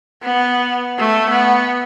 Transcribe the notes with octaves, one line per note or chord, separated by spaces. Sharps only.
B3
A3
B3